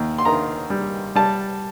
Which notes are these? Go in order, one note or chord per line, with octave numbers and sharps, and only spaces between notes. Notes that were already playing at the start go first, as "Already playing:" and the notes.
Already playing: D#2
C6
D#3 A#5
G3
G3 A5